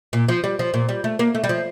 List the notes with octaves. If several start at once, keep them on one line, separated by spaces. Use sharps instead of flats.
A#2
F3
G3
F3
A#2
G3
A3
A#3
A3
G3
F3